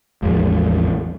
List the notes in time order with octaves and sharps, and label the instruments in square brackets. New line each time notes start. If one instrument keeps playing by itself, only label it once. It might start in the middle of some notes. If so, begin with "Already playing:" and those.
[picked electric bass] A1 E2 F3 G#3